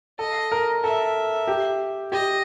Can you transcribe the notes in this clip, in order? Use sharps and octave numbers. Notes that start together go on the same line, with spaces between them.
A4 D#5
A#4
A4 E5
G4
G4 D#5